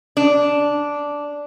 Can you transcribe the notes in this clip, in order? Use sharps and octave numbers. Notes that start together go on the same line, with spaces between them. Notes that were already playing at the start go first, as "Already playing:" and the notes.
D4